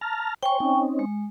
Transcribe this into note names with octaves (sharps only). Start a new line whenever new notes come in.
A5 A#5 F6
C5 C#5 G5 G#5 C#6
C4 C#4 D#4
G#3